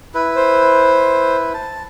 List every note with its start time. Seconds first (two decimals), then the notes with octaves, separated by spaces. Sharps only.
0.15 E4 B4
0.36 C5
1.54 A5